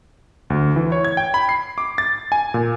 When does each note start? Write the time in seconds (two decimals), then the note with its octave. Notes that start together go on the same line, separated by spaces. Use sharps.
0.50 D2
0.76 E3
0.92 C#5
1.05 G#6
1.17 G5
1.34 B5
1.49 C7
1.78 D6
1.98 A6
2.32 G#5
2.54 A#2